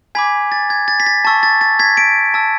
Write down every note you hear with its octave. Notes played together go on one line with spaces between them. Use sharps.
G#5 B5 D6 G#6 B6
A6
G#6
A6
B6
A6
A5 C#6 E6 A6
A6
A6
G#6 B6
B6 D7
A5 E6